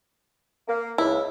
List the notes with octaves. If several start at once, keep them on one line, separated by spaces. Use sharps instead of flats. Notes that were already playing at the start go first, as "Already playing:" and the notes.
A#3
C#2 E4